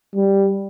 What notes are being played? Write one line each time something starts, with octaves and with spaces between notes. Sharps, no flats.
G3